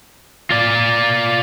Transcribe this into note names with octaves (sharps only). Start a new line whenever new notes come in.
F4 D5